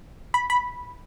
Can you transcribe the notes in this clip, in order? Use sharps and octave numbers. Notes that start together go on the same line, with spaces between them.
B5
B5